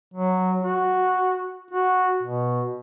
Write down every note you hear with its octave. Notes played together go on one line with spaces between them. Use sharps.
F#3
F#4
F#4
B2